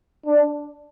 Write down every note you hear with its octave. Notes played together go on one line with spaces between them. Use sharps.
D4